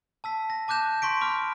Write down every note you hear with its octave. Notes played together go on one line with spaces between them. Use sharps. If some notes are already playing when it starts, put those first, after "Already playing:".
A5 E6 B6
A#6
A5 D6 F#6 G6 E7
C6 C#6 B6 D7
B5 D6 F6